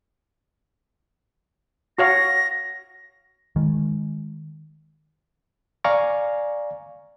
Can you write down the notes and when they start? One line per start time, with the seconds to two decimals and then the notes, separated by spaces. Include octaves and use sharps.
1.98 F#4 C#5 F5 A#6
3.56 D#3 G#3
5.84 D5 F5 G#5 A#5 C#6